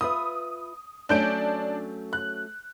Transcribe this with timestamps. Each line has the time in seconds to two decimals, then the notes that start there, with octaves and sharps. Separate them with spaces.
0.01 F4 B4 E5 D#6
1.09 F#3 A3 C#4 D4 G6 D7
2.13 F#6